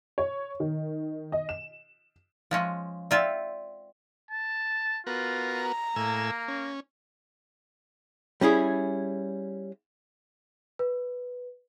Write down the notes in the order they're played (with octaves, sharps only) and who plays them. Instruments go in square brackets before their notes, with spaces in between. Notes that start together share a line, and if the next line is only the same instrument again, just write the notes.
[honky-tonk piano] C#5
D#3
D#5
E7
[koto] F3 G#3 C#4 [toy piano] F5
[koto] C4 F4 E5 [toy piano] D5 G5
[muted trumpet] A5
[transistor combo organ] B3 F#4 A#4 [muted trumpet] F4
[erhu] A#5
[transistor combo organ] A2 G#5 E6 [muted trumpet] A#3
[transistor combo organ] C#4
[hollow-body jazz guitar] G3 C#4 E4 G#4
[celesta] B4